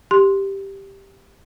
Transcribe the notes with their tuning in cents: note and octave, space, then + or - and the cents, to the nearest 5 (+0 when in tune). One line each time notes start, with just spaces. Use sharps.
G4 +0 C6 +0